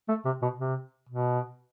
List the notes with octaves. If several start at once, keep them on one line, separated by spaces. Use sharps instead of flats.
A3
C3
B2
C3
B2